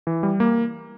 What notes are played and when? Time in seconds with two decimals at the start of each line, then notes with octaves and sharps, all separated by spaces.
0.07 E3
0.23 G3
0.40 A#3